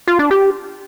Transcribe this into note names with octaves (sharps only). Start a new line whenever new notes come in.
F4
D4
G4